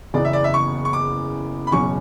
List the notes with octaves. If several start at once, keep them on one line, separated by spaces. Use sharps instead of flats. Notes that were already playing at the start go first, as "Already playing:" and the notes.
F#1 E2 C#3 E3 B3 D5
E5
D5
E5
C#6
C#6
D6
B5
F#1 E2 B2 F#3 C#4 C#6